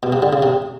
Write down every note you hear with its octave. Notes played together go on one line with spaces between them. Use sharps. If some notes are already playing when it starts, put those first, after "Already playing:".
B2
C3
D3
C#3
C3